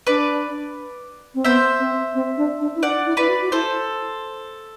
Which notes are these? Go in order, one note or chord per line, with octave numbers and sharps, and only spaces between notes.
D4 B4 D5
C4
B3 C5 E5
C4
C4
D4
D4
E4
D4 D5 F#5
E4
E4 B4 D5
F#4
F#4
E4 A4 C5